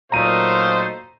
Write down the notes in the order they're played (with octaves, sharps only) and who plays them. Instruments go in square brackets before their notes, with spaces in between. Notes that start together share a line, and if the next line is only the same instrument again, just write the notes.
[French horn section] A#2 F#3 [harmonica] A3 D#4 F5 [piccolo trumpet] C5 [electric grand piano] A#5 D#7